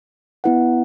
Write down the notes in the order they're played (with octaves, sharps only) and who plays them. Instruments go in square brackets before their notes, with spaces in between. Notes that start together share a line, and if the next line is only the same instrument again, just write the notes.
[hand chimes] B3 E4 B4 F#5